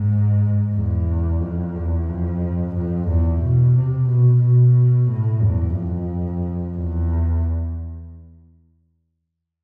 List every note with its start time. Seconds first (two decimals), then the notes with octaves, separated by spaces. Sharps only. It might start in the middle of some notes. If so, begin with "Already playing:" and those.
Already playing: G#2
0.75 E2
1.41 F2
1.75 E2
2.09 F2
2.76 F2
3.09 E2
3.43 B2
3.76 C3
4.09 B2
4.43 B2
5.10 A2
5.43 E2
5.77 F2
6.77 E2